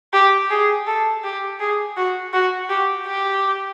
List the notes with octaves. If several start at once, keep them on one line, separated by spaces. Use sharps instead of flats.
G4
G#4
A4
G4
G#4
F#4
F#4
G4
G4